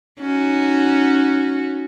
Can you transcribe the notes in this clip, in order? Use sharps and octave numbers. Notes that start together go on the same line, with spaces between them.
C#4 D#4 F#4